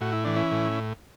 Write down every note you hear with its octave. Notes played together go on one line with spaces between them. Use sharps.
A2 F#4
E4
E3 D4
C#4 E4
A2